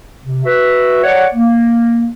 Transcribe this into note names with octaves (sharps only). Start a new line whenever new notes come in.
C3
F#4 B4 E5
C#5 D5 F#5
A#3